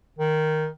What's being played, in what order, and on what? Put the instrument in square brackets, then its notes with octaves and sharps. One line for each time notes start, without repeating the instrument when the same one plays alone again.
[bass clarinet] D#3